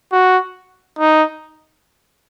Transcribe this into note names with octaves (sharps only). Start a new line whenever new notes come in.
F#4
D#4